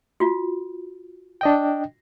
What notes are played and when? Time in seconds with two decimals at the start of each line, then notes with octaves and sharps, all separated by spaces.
0.20 F4 F#4
1.41 D4 D#5 G5